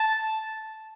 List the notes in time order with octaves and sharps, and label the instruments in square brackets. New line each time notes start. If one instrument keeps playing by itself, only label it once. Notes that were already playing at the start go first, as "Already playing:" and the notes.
Already playing: [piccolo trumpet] A5